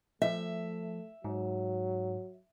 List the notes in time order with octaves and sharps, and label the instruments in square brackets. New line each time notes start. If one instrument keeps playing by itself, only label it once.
[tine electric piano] F3 [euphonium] A3 [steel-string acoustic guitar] E5
[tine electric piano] G#2 [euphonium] F#3